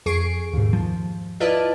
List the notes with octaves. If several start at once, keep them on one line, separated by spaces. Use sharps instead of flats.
F2 G#4 C#6 C7 D7
D#2 G#2
F3
E4 F4 B4 D5 D#5 A5